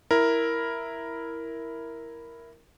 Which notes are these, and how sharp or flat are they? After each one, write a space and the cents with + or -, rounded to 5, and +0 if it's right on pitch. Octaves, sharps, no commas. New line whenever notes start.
E4 +0 A#4 +0